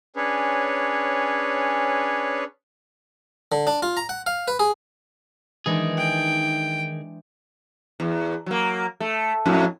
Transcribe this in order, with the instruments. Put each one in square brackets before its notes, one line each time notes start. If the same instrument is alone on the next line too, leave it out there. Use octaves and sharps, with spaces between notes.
[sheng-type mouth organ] C#4 D4 G#4 B4 C#5
[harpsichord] D3
D4
F4
A#5
F#5
F5
B4
G#4
[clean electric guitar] D#3 D#4 G#4 [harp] E3 G#3 D4
[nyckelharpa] G5
[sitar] E2
F#3 A#3
A3
F2 A2 F#3